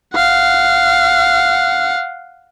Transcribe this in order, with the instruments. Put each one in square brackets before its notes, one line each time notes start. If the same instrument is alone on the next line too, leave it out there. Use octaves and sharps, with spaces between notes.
[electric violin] F5 F#5